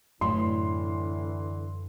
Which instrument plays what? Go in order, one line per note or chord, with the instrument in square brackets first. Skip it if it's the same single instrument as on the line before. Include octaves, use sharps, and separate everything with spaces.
[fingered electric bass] F#2 [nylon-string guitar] A2 E4 [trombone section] D3 E3 [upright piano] C6